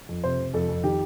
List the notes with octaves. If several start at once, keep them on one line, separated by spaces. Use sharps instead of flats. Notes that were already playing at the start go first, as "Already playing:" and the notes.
F2
C3 C5
C3
F2 A4
F2
D#3 G4